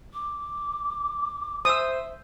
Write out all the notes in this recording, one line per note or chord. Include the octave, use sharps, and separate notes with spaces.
D6
C5 E5 D#6 E6